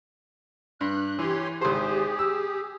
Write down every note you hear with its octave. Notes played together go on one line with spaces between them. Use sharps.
G2 F#6
E3 G4 C#5 C6
G#1 G4 G#4 C5
E6